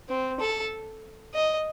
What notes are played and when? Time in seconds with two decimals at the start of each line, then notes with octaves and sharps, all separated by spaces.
0.09 C4
0.40 A4
1.34 D#5